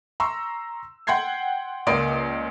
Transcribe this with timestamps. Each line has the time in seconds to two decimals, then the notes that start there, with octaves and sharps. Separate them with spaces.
0.20 A#5 C6 C#6 E6
1.07 F#5 G5 C6 G6 G#6 C7
1.87 C#2 A#3 D5 C6 D#6 D7